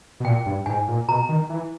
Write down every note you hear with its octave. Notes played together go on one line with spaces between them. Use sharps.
B2
A#2 G5
G2
G#2 G#5
A#2
B2 A#5
D#3
E3